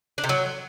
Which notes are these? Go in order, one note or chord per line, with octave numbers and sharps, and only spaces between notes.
D4
C3
F#3